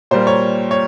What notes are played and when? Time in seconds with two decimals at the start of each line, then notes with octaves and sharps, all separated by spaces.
0.11 A#2 G3 A#3 C5
0.27 C#5
0.71 C#5